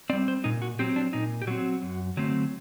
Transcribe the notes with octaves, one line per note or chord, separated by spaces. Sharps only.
G3 C4 D5
C5
A#2 D#4
F#4
F#3 C4 G4
D4
A#2 D#4
G4
F#3 C4 F#4
F#2
D3 F#3 A3 C4